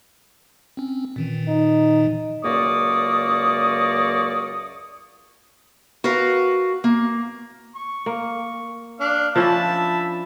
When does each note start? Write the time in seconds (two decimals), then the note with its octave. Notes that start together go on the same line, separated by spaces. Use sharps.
0.77 C4 C#4
1.16 A#2 D#3 E3
1.48 D#4
2.44 C#2 F#2 A#3 D5 C#6 D#6
6.04 F#4 A#4 B4 F5
6.84 A#3
7.76 C#6
8.06 A#3
9.00 D4 F5
9.36 F3 C#4 D4 E5 A5 B5